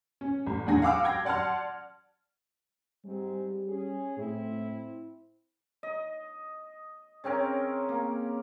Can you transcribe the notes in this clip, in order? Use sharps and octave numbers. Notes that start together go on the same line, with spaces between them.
C#4
A1
E2 A2 D4 F#5 G#5 A#6
F5 F#5 D6 E6 F6
G5 G#6 A#6
D5 F#5 A5 C6 F6
G#2 G3 C4
C#4 G#4
A2 C4 E4
D#5
C#3 C4 C#4 A#4
A#3